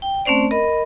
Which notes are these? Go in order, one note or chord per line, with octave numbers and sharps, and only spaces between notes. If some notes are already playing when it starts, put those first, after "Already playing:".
G5
A3 C4 C#4 C5 D5
A#4 D#5 B5